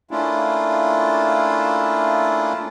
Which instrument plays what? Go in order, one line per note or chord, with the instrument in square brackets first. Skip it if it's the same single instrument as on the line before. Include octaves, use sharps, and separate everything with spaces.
[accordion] A3 A#3 C#4 D4 E4 F4